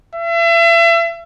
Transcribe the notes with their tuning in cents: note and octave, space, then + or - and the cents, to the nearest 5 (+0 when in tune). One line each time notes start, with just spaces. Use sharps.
E5 +35